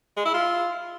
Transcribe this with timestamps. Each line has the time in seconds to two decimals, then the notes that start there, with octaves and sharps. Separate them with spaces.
0.17 G#3
0.25 E4
0.34 F4